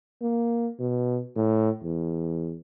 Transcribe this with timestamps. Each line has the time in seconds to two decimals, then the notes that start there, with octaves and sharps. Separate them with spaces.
0.22 A#3
0.79 B2
1.36 A2
1.84 E2